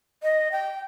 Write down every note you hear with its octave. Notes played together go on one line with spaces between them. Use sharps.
D#5
G5